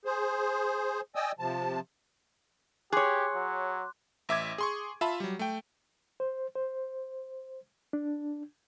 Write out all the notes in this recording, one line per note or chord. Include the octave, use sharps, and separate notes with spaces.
G#4 C5
D5 D#5 G5 G#5 D#6 E6
C3 F3 A5
G4 G#4 C#5 C6 D6 F#6
F#3
A1 E5 D6 G#6
G#4 C6 C#6
F4 E5 A5 B5
F#3 G3
A3 G5
C5
C5
D4